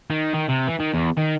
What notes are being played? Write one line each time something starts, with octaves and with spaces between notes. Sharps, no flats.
D#3
D#3
C3
E3
D#3
E2
D#3